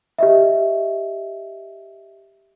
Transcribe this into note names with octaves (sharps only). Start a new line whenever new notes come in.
G4 D#5 E5